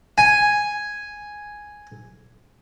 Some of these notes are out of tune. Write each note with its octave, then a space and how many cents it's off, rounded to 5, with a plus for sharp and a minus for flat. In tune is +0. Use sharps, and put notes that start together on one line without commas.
G#5 +0